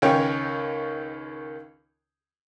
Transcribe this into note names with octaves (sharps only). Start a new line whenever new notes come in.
C#2 D#3 C#4 C#5 G5 C#6